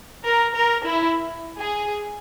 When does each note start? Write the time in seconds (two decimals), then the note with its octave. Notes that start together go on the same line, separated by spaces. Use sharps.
0.25 A#4
0.55 A#4
0.85 E4
1.59 G#4